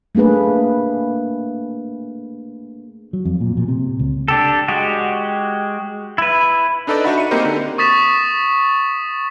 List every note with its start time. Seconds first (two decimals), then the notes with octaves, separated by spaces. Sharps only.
0.15 A3 A#3 D4 G#4 B4
3.13 F#3
3.25 F2
3.41 A#2
3.57 A#2
3.68 C3
3.99 C#2
4.28 D4 G4 A4
4.68 G#3 F#4 G4
6.18 E4 B4
6.87 D4 D#4 A4 B4 D5 D#5
7.04 D4 D#4 F#4 E5 F#5 B5
7.18 C#7 D#7
7.31 A#3 C4 D#4 G4 A#4 C5
7.45 D3
7.78 C#6 D#6 A6 B6 E7